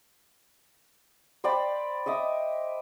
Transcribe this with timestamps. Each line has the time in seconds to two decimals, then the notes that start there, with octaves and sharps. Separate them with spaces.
1.44 C5 D5 G5 B5
2.06 D#5 E5 D6 D#6